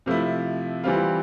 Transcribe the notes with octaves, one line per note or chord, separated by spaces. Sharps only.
C3 F3 A3 E4
E3 G3 C4 F4